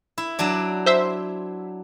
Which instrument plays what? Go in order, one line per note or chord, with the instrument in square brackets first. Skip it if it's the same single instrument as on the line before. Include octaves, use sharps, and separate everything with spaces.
[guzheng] E4
F#3 D4 D5
[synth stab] C5 E5